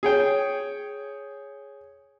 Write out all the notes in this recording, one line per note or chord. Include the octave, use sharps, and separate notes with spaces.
G#4 C#5 G5